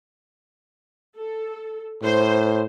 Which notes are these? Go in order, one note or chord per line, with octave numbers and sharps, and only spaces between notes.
A4
A2 C5